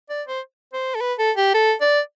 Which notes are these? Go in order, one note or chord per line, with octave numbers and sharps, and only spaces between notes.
D5
C5
C5
A4
B4
A4
G4
A4
D5